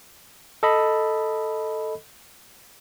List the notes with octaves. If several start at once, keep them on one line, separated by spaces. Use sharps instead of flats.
A4 D#5 B5